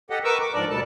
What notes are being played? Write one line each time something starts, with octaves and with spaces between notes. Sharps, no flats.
G4 A4 D#5 F#5
A#4 B4 C#6 D6 E6
D6
G#2 F3 D4 A#4 D5
D2 B2 G3 A4 A5